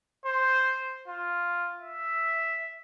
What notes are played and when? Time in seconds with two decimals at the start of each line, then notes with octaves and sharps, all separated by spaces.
0.26 C5
1.08 F4
1.79 E5